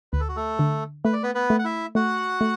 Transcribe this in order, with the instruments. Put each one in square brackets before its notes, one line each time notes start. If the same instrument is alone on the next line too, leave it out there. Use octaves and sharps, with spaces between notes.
[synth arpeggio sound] D2 [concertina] B4
[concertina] A4
F#4
A3 A4
[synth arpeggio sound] D3
[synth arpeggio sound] A3 [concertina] B4
[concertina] D5
B3 B4
B3 B4
[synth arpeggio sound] A3
[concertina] F#5
E4 E5
[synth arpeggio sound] A3 [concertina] F#4 F#5
[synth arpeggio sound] A3